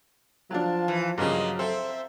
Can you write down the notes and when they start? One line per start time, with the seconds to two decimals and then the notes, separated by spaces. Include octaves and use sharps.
0.51 F3 F#3 D4 F5 A5
0.88 E3
1.18 G2 C#3 F3 F#3 A#3 D#5
1.59 C4 A4 C5 E5